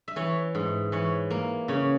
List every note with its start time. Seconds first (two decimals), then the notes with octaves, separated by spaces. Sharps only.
0.08 E5
0.16 E3 C#5
0.55 G#2
0.92 E3 C#5
1.30 A#3
1.68 C#3 C#5